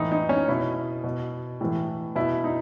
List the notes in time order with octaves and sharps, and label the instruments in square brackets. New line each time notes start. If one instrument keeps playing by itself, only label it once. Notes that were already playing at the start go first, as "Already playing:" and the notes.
Already playing: [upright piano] A2 E3 D#4
D#4
C#4
B2 E4
B2
A2 E3
B2 E4
D#4